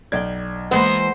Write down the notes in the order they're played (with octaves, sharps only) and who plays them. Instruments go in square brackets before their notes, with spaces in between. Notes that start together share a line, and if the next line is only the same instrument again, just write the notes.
[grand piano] B1 G#6 [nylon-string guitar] D5 G5
[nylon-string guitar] E3 G#3 A#3 [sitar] B3 [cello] C5